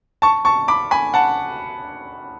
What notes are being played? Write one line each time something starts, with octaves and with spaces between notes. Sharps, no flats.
A5 C#6
A5 C#6
B5 D6
G#5 B5
F#5 A5